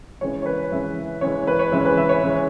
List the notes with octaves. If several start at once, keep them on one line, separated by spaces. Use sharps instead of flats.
C#3 E3 G#3 C#5
C#5
B4
C#3 E3 G#3 E5
C#3 E3 G#3 C#5
B4
C#5
C#3 E3 G#3 E5
B4
E5
C#5
C#3 E3 G#3